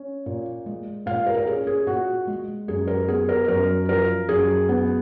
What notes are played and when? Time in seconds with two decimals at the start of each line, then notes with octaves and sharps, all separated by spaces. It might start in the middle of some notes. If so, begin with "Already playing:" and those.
Already playing: C#4
0.26 A#2
0.66 G#3
1.06 A#2 F5
1.27 A#4
1.38 A#4
1.46 C#4 G#4
1.67 G#4
1.87 A#2 F#4
2.27 G#3
2.68 F#2 G#4
2.87 A#4
3.08 B3 G#4
3.29 A#4
3.48 F#2 A#4
3.89 F3 A#4
4.29 F#2 G#4
4.69 B3